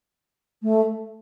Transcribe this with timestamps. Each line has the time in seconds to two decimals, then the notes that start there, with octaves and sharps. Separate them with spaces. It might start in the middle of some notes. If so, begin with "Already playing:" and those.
0.62 A3